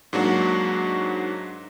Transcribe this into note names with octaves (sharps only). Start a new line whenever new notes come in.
G#2 F#3 A#3 D4 F#4